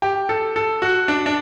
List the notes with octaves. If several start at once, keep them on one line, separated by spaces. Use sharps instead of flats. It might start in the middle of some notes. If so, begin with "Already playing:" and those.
G4
A4
A4
F#4
D4
D4